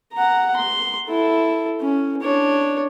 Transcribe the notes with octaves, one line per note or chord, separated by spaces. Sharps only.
F#5 A#5
C6
E4 A4
C#4
D4 C#5